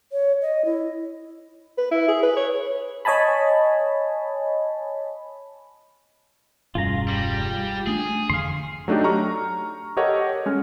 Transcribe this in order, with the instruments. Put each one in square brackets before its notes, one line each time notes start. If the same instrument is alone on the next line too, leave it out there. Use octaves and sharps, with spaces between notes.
[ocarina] C#5
D#5
E4
[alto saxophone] B4
E4
G#4
B4
C#5
[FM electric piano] C#5 D#5 G#5 A5 B5
[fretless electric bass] E1 G2 C#4 [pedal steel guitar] F4 G#4 A#5
[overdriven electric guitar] G3
[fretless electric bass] A3 D4 [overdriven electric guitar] G#4
[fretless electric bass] F2 D3 [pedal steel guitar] F5 C6
[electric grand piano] F#3 A3 D4 D#4 G4
A#5 C#6 F6
G4 A4 A#4 C#5 D#5 F#5
G#3 C#4 F6